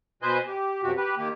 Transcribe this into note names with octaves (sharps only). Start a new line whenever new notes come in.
B2 B4 C5 D#5 G#5 G6
G4
F#2 C3 F#4 G4
G4 B4
D#3 A#3 G4